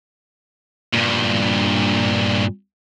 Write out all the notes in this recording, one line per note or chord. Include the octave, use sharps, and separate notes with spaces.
G2 A#2